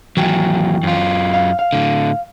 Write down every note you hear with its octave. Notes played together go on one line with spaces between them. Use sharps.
D#2 E3 F#3 G5 G#5
F#2 F4
F5
F5
A2 D3